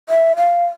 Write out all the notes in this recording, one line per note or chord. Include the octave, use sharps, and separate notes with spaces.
E5
F5